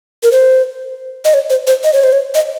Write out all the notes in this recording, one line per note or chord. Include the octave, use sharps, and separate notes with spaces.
A#4
C5
D#5
C#5
C5
C5
D#5
C#5
C5
C#5
D#5